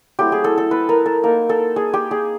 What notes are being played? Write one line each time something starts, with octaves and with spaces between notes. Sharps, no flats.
F#3 A3 C4 E4 G4
G#4
A4
A4
B4
A#4
A4
A#3 D#4 A#4
A4
G#4
G4
G#4